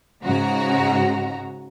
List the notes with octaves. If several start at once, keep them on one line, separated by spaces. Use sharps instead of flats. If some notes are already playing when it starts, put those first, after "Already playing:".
G#2 C#3 F#4 A#5